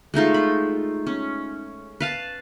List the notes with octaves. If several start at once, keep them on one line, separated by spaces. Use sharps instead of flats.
G#3 A3 D#4 F4
B5
C#4
B4 F5 A5